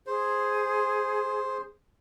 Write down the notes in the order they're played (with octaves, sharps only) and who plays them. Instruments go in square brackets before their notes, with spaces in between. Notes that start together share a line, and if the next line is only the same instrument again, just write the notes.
[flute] G#4 [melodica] C5